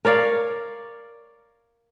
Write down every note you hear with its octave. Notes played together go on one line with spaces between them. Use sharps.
A#4 C#5 D5 F5